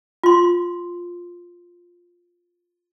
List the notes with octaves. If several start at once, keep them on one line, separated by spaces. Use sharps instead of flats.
F4 C6